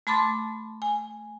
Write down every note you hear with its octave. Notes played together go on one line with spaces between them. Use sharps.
A3 A5 B5 C6 D6 A6
G#5